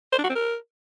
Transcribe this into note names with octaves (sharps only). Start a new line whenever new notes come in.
C5
D4
F#4
C4
A#4